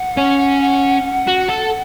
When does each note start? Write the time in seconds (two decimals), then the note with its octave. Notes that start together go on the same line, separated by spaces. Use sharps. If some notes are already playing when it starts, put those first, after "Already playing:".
Already playing: F#5
0.17 C#4
1.28 F#4
1.49 A4